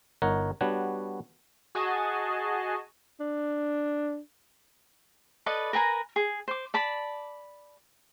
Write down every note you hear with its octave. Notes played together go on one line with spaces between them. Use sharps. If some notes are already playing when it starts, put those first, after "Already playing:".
G1 D#4 A#4 C#5 F#5
G3 B3 D4 F#4 C#5
F#4 G#4 D#5 G#5 A5
D4
A4 B4 D5 D#5
A#4 B4 G#5 A#5
G#4
C5 D6
D5 A5 B5